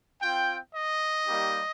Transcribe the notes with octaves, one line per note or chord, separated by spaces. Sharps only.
C4 F4 G5
D#5
G3 A#3 D#4 G4